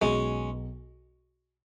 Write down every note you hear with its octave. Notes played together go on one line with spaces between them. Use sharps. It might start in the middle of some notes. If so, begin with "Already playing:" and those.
B1 B2 G#3 B3 C#4 G#4